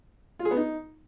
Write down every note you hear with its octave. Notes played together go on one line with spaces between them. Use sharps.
F4
G#4
B3
D#4